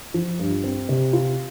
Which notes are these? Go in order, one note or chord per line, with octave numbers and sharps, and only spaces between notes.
F3
G2
C4
C3
F4